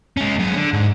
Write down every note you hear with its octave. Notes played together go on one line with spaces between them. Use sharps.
G#3 C#4
F#3 G#4
D3
G#2